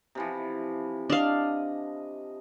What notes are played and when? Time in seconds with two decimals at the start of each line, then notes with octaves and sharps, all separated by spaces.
0.15 C3 E3 F3
1.10 D4 D#5 F5